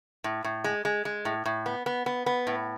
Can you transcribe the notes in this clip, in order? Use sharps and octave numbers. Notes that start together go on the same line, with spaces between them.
A2
A2
G#3
G#3
G#3
A2
A2
B3
B3
B3
B3
A2